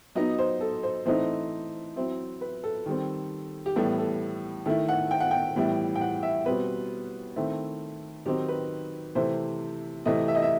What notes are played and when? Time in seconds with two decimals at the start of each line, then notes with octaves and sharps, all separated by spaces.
0.15 F#3 B3 D#4 D#5
0.39 C5
0.61 A4
0.83 C5
1.06 E3 A3 C4 D#4 C5
1.96 F#3 C4 E4
2.41 B4
2.64 A4
2.86 D#3 G3 C4
3.66 G4
3.76 A2 E3 G3 B3 A4
3.98 A4
4.66 D#3 A3 E4 A4
4.89 F#5
5.11 G5
5.20 F#5
5.31 G5
5.56 A2 E3 G3 B3 E4
5.96 G5
6.01 F#5
6.23 E5
6.46 B2 G3 C4 B4
7.36 D#3 A3 C4 E4
8.26 D#3 F#3 C4 D#4 G4
8.48 B4
9.15 C3 E3 A3 C5
10.05 C3 E3 A3 D#5
10.28 E5
10.35 D#5
10.42 E5